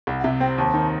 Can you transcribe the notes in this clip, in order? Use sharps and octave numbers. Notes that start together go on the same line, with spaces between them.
C2
F#5
C3 E5
C4 G5
D#2 A5
D#3